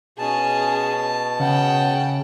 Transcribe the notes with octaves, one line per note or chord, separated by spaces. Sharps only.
B2 C#4 G#4 A5
C#3 F#5 G5